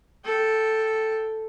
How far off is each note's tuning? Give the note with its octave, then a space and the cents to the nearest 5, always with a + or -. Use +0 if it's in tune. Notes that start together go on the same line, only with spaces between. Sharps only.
A4 +0 G5 +0